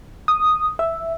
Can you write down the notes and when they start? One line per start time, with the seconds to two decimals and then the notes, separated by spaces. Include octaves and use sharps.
0.28 D#6
0.79 E5